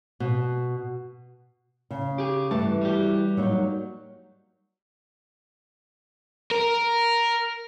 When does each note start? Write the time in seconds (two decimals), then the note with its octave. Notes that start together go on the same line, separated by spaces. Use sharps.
0.20 B2
1.91 C#3
2.18 G4 G#4
2.51 G2 E3 A3 A5
2.81 G3 F#4 G4
3.37 F#3 A#3 D#4
6.52 A#4